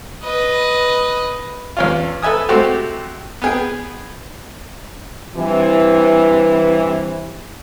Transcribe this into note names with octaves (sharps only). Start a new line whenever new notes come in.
B4 D#5
E2 C#4 F4
A4 B4 E5 G#5 D#6
G#3 A3 C4 F#4 G4 A4
B3 G#4 G5
G2 C3 E3